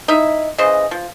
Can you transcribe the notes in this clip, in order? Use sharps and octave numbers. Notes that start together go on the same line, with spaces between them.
D#4 E4 E5
C#3 E3 C5 D#5
F3